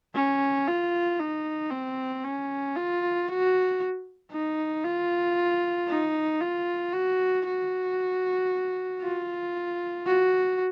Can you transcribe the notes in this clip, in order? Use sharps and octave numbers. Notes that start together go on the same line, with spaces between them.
C#4
F4
D#4
C4
C#4
F4
F#4
D#4
F4
D#4
F4
F#4
F#4
F4
F#4